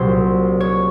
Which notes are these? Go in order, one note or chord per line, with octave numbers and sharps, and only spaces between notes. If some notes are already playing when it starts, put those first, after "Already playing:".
Already playing: C2 A#2 F#3 C5
C#5